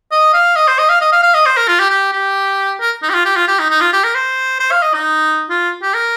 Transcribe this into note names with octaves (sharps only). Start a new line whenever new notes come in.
D#5
F5
D#5
C5
D#5
F5
D#5
F5
F5
D#5
C5
A#4
F4
G4
G4
G4
A#4
D#4
G4
F4
G4
F4
G4
D#4
D#4
F4
G4
A#4
C5
C5
F5
D#5
D#4
F4
G4
A#4